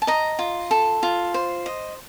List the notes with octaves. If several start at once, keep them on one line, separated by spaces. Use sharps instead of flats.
A5
D#5 A#5
F4
A4
F4
C5
D#5